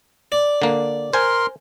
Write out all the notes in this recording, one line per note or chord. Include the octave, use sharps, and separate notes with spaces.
D5
D3 A#3
A#4 C5 G#5 C6